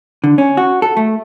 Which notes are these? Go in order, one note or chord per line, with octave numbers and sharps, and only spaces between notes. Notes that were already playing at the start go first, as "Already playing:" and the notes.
D3
C#4
F#4
A4
A3